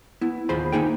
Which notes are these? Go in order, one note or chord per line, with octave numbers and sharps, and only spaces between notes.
B3 E4
D#2 F4 G#4 C5 B5
A#3 D#4 G#4 G5